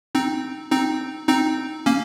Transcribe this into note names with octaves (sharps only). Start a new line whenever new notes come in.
C4 D#4
C4 D#4
C4 D#4
A#3 C#4